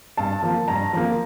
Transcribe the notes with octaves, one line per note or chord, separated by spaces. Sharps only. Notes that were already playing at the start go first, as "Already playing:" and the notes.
G2 A5
F3 A#3
G2 A#5
F3 A#3